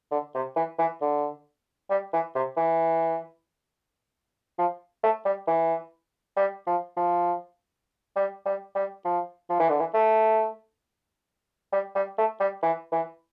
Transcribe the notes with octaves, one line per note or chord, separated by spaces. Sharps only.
D3
C3
E3
E3
D3
G3
E3
C3
E3
F3
A3
G3
E3
G3
F3
F3
G3
G3
G3
F3
F3
E3
D3
E3
A3
G3
G3
A3
G3
E3
E3